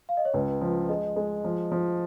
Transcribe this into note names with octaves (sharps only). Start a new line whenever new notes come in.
F5
D#5
C#5
C#2 B4
F3
G#3 D#5
G#3
F3
F3